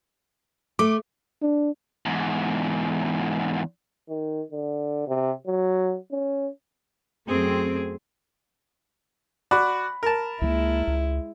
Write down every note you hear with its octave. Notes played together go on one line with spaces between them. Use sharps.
A3 D6
D4
E2 G#2
D#3
D3
C3
F#3
C#4
F#2 A3 C4 G#4
F#4 D5 B5
A#4 A5
C#2 F#3 G#3 A#3 E4
C#2